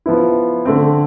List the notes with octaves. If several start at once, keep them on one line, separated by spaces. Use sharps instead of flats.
F3 B3 E4
D3 A3 C4